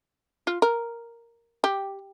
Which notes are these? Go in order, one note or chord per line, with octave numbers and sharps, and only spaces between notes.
F4
A#4
G4